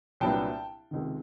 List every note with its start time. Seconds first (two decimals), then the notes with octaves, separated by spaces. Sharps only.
0.20 C2 A#2 F#3 B3 D4 G5 A5
0.91 C#2 C3 D#3